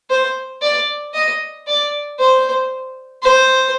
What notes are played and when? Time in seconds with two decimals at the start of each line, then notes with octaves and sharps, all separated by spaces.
0.10 C5
0.62 D5
1.14 D#5
1.67 D5
2.19 C5
3.23 C5